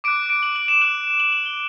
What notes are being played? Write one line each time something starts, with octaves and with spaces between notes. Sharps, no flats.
D6 F#6 D7
D7
F#7
F#7
E7
D6 F#6 F#7
F#7
F#7
G7